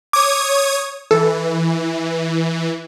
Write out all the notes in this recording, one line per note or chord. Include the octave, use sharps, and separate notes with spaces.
C#5 D6 D#6 G#6
E3 A4